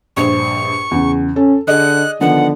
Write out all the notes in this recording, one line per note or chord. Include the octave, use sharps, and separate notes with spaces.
A#1 G2 C5 C#6
E2 C#3
C#4 A4
D3 G#4 D5 D#5 F#6
D3 D#3 F3 B3 F#5